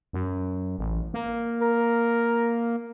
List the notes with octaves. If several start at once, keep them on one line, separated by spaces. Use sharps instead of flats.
F#2
A1
A#3
A#4